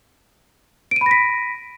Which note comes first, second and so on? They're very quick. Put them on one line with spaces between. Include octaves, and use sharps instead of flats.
D7 D#7 B5 A#6 B6